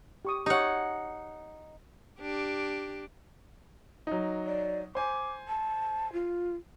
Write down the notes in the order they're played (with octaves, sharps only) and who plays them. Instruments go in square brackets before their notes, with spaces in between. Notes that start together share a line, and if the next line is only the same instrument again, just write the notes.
[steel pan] G4 C#6 D#6
[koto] D#4 F#5 [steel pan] G4 C#5
[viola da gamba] D4 G4
[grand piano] F#3 D#4
[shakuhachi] D5
[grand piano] C5 G#5 [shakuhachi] D6
[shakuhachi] A5
F4